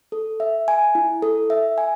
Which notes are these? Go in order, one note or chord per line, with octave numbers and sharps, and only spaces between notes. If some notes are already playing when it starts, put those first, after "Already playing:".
A4
E5
G#5
E4
A4
E5
G#5